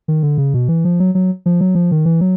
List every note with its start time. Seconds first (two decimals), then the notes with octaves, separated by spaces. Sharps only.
0.08 D#3
0.23 D3
0.38 C#3
0.54 B2
0.68 E3
0.85 F3
1.00 F#3
1.15 F#3
1.46 F3
1.61 F#3
1.75 F3
1.91 D#3
2.05 E3
2.21 F#3